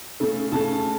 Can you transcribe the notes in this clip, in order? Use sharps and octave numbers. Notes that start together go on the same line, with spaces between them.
C#3 A3
C#3 A3 A5